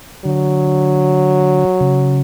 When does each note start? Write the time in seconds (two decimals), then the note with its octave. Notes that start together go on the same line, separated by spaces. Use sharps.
0.25 D3 F#3
1.81 C#3